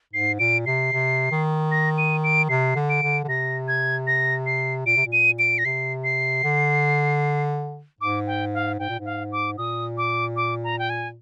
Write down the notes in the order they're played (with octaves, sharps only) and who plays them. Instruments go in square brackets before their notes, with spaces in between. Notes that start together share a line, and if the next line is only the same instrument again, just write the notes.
[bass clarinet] G#2 [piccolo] C7
[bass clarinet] A#2 [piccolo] D7
[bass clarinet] C3 [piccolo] C7
[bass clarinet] C3
D#3
[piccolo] A#6
D#7
D7
[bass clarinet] C3 [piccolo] C7
[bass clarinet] D3
[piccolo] D7
[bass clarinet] D3
D3
[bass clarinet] C3 [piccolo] A#6
[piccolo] G#6
A#6
C7
[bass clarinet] A#2 [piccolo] D7
[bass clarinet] C3
A#2
[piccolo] D#7
D7
A#6
[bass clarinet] C3 [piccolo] C7
[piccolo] C7
[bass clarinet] D3
[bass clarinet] G#2 [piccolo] D6
[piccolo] G5
F5
[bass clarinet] G#2 [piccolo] G5
[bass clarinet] A#2
G#2
[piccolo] F5
D6
[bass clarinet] A#2 [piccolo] D#6
[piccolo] D6
D6
A#5
G5
G#5